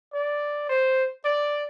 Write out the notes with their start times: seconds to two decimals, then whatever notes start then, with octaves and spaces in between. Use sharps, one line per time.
0.14 D5
0.69 C5
1.26 D5